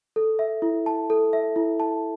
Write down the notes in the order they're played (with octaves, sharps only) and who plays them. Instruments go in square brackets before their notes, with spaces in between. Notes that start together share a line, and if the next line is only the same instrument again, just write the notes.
[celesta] A4
E5
E4
A5
A4
E5
E4
A5